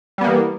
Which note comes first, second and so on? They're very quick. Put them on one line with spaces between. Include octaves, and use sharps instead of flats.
G3 B3 A#3 E3